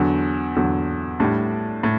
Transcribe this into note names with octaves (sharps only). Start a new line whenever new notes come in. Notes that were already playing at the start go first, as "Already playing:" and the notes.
Already playing: E2 D3 F#3
E2 D3 F#3
A2 G3 D4
A2